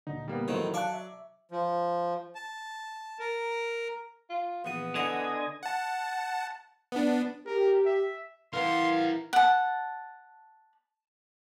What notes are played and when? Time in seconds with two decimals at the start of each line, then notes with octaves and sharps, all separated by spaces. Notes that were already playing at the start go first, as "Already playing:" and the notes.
0.07 D2 A#2 D3 D#4
0.28 G3 A#3 B3
0.48 A1 D#3 F#3 C5
0.74 D5 F5 A5 C#6 F#6
0.94 E5
1.51 F3
2.35 A5
3.20 A#4
4.30 F4
4.65 A#1 E3 B3 D#6
4.95 D3 E4 D#5 F#5 G#5 D#6
5.63 F#5 A5
6.92 B3 D4
7.46 G4 A#4
7.86 E5
8.53 E3 A#4 F5 F#5 C6 F6
9.33 F#5 A5